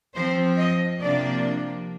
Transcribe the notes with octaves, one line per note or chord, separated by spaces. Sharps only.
F3 C4 C5
D#5
C3 F3 A#3 D4 D5